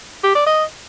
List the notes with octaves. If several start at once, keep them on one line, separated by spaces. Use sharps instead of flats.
G4
D5
D#5